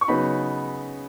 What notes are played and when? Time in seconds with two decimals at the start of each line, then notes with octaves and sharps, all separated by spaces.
0.01 C#6
0.08 C#3 F#3 B3 D#4 B5